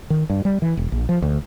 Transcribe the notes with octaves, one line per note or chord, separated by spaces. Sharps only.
D#3
G2
G3
E3
E1
A#1
F3
D2